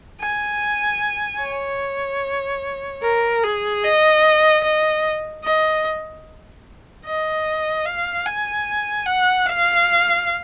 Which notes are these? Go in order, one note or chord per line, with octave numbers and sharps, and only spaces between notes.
G#5
C#5
A#4
G#4
D#5
D#5
D#5
D#5
F5
G#5
F#5
F5